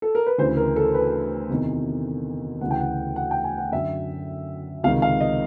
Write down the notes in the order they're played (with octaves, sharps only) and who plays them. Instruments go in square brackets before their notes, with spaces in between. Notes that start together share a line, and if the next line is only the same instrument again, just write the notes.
[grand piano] A4
A#4
B4
D2 C#3 E3 C5
A#4
A4
B4
E2 C3 D#3
D2 C#3 E3 F#5
G5
F#5
F#5
G5
G#5
F#5
F#2 D3 E5
C#2 C3 D#3 F5
F5
D#5